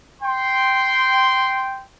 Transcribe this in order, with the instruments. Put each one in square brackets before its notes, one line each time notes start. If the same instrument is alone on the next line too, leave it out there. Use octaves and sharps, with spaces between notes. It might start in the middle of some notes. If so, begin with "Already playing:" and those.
[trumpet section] G5 C6